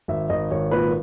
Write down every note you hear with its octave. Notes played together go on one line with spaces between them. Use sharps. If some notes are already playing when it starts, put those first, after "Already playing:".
G#1 E5
G#1 D#5
G#1 C#5
A#2 B4